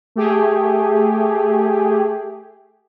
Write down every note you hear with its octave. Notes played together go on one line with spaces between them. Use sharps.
A3 G4 G#4